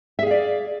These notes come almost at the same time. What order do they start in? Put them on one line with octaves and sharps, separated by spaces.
E5 G#4 F5 D5